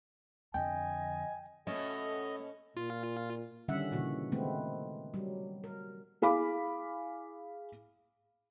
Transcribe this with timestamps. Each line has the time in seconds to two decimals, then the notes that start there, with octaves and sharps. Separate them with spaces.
0.54 F2 D3 D#5 G5 G#5
1.67 B2 A3 C#4 A4 D#5
2.77 A#2 F4
3.68 D3 D#3 G3 C#4 E5 F#5
3.91 A#2 C#3 E3 F#4
4.32 D#3 G#3 A3 B3 C4
5.14 F#3 G3
5.64 A#4
6.22 E4 G#4 F5 B5 D6